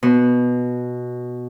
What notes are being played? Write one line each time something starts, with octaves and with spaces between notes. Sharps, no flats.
B2